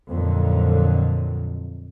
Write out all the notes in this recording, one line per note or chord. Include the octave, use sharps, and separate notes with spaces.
F2 A#2 D3 D#3 F3 F#3